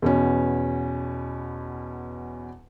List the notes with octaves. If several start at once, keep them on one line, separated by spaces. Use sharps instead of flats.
E2 B2 C#4